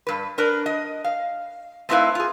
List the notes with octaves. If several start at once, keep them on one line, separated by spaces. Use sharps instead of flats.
G2 B4
D4 A#4 B4
D#5
F5
A3 C4 D#4 E4 B4 F5
F4 G#4